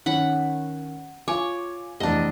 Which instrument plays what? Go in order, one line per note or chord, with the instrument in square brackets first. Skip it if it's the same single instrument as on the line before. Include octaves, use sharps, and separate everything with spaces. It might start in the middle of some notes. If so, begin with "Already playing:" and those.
[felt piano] D#3 C#4 [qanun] F#5 B5
[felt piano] F4 G#5 D6 [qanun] C#5
[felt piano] F1 E2 [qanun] D4 D#5